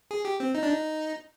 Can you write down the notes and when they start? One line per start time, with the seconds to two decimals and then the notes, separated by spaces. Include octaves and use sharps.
0.11 G#4
0.25 G4
0.40 C4
0.55 D#4
0.63 D4
0.70 D#4